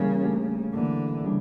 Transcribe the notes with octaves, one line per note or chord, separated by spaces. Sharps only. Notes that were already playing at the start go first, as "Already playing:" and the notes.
Already playing: C#3 E3 G3 A#3 C#4 A#4
A3 D4 G4
D3 E3 A#3 E4 A4
C#3 G3 D4